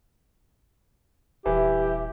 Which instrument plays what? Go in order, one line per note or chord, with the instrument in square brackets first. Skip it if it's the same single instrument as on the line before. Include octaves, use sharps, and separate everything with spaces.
[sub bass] D#1 [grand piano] E3 [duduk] G4 [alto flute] E5